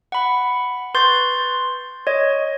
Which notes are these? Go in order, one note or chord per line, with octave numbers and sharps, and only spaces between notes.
F#5 B5
B4 C6 C#6 G6 A6
C#5 D#5